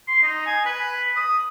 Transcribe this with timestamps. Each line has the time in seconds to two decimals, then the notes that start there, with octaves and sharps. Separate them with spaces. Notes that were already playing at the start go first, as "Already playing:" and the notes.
0.08 C6
0.22 D#4
0.46 G#5
0.65 B4
1.16 D#6